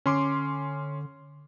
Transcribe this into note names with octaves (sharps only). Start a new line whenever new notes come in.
D3 C#4 C6 D6